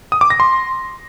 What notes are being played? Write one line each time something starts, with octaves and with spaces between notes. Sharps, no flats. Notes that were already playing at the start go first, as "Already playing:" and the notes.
D#6
D6
A#6
C6